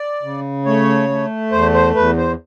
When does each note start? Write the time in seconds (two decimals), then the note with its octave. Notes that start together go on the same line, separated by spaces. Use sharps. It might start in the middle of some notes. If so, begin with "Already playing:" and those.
Already playing: D5
0.23 C#3
0.65 A3 C#5
1.09 A3
1.52 E2 C5
1.74 C5
1.95 E2 B4
2.17 C5